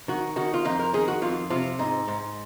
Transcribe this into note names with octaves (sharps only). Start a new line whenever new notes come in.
D#3 F#4
D#3 F#4
F4
F2 D#4
A#4
D#3 G#4
F#4
F2 F4
C3 F4
G#2 D#4
G#2